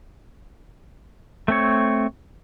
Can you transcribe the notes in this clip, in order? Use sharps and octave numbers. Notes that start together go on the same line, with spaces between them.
A3 C4 C#5